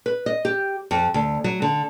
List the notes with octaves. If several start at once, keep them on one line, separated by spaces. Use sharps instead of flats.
B4
D#5
G4
F2
D2
F#3
D3